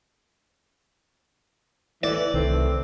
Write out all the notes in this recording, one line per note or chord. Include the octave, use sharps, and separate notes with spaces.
A2 E3 D5
C2 D#3 A3 C4 B4